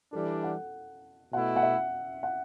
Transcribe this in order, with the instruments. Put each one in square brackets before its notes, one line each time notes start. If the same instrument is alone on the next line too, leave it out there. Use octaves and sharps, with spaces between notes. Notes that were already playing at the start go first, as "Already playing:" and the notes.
[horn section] E3 G3 D4 [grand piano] A4
[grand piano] F#5
[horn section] B2 A3 E4 [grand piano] F#5
[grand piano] F#5
E5
F#5